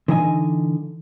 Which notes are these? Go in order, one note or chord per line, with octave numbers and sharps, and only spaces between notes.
D3 E3 D#4 D#5 F#5 G#5